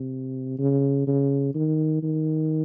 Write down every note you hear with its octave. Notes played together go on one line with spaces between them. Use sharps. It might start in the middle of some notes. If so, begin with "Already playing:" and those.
Already playing: C3
C#3
C#3
D#3
D#3